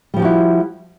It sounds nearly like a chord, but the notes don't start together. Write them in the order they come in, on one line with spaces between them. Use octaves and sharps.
G3 F3 G4 F#4 E4